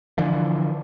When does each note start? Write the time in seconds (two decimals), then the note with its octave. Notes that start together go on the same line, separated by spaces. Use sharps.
0.18 D3 E3 F3